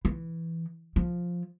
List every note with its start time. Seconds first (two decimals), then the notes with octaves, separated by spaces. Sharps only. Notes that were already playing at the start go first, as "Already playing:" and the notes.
0.05 E3
0.96 F3